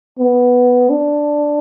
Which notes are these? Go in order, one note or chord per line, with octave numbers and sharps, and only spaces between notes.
B3
D4